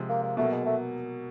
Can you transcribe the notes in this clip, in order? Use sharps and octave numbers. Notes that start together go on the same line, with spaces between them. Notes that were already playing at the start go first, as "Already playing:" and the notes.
Already playing: C3 F3 G#3
A#3
A#3
B2 F#3 A3 A#3
G#3
A3